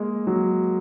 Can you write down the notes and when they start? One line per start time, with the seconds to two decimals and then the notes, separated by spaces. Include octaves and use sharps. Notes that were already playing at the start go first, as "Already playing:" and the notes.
Already playing: G#3 A#3
0.27 F#3